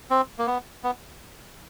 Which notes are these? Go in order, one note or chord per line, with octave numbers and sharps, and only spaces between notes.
C4
A#3
B3
B3